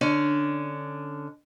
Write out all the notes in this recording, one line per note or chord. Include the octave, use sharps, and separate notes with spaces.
D3 C#4 D4